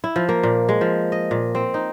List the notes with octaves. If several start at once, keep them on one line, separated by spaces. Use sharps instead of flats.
E4
F3
A#3
A#2
G#3
F3
D#5
A#2
C4
D#4